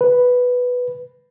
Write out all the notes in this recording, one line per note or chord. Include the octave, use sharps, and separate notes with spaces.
B4